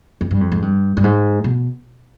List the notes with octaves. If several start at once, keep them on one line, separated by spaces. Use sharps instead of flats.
F2
G2
F2
G#2
G2
G2
G#2
B2